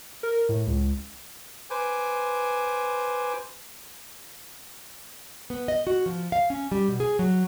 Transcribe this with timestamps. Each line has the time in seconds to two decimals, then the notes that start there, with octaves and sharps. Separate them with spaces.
0.23 A#4
0.49 A2
0.67 C#2
1.70 B4 C5 G#5 D6
5.50 B3
5.68 D#5
5.87 F#4
6.06 F3
6.32 F5
6.50 C#4
6.72 G3
6.88 B2
7.00 G#4
7.19 F#3